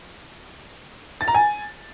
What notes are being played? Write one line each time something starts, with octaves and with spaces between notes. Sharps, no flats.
A6
A#5
G#5